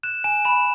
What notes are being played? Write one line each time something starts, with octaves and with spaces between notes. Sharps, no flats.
F#6 E7
G#5 E7
B5 E7